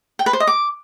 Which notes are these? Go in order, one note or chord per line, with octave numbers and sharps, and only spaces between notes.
G5
B4
C5
D#5
D6